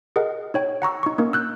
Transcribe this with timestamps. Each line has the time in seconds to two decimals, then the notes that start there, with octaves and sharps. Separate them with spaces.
0.16 G#4 A#4 D#5 F#5
0.54 D#4 C#5 G5
0.82 F#5 A#5 C#6 E6
1.03 D#4 C#6
1.18 A#3 C#4 D#4 A#4
1.33 E6 F#6 G6